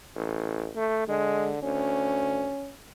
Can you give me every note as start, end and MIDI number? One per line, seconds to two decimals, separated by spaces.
0.16 0.69 33
0.75 1.06 57
1.08 1.58 50
1.08 1.52 56
1.63 2.47 38
1.63 2.72 61